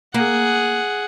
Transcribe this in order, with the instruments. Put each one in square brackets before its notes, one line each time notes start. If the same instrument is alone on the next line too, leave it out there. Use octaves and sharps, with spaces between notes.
[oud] A#3 [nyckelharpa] G#4 F#5